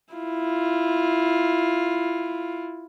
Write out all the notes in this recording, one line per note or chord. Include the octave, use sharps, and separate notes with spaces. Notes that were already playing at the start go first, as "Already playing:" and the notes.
E4 F4